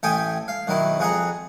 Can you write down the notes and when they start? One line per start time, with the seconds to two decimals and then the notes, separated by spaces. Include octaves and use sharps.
0.03 A1 A4 E5 G5 G#5 D#6
0.48 F5
0.67 B1 D#3 F#3 E4
0.99 F2 G#4 F#5 A#5